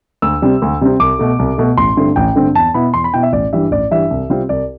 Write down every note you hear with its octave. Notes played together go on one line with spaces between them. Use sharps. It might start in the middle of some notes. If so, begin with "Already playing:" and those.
D2 E6
C3 G3 C4
D2
C3 G3 C4
C2 D6
B2 A3
C2
B2 A3
A1 C6
G2 D3 A3 C4
A1 G5
G2 D3 A3 C4
E2 A5
B2 B3 E4 B5
E2 C6
B5
B2 B3 E4 G5
E5
A1 D5
G2 E3 G3 D4 E5
A1 D5
G2 E3 G3 D4 E5
C2
C3 G3 C4 F4
C2 D5